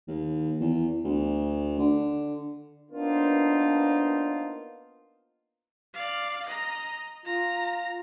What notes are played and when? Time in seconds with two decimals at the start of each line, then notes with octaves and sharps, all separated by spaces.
0.08 D#2
0.60 E2
1.04 D2
1.78 D3
2.91 A#3 B3 D4 D#4 F4 C5
5.94 D5 F5
6.46 D#5 A#5
7.26 F4 A#5